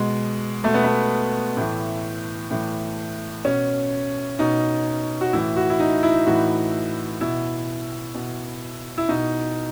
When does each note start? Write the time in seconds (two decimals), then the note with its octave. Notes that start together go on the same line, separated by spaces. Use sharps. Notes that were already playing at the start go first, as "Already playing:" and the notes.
Already playing: B2 G#3
0.64 B2 A3
0.74 B3
0.84 A3
1.57 A2 E3
2.51 A2 E3
3.44 B2 C#4
4.39 B2 D#4
5.21 F#4
5.33 A2 E3 E4
5.56 F#4
5.70 E4
5.80 D#4
6.03 E4
6.27 A2 E3 F#4
7.21 B2 E4
8.15 B2
8.98 E4
9.08 B2 D#4